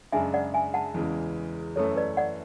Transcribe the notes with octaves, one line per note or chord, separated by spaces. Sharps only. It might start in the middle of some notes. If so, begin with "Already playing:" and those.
F#2 C#3 G#3 D4 E5 G#5
D5 F#5
E5 G#5
F#5 A5
E2 C#3 E3 G#3
F#2 E3 A3 A4 C#5
B4 D5
D5 F#5